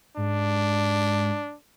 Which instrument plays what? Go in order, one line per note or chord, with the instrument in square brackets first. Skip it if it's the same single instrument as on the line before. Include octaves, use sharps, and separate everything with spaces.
[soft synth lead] G#2 [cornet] D4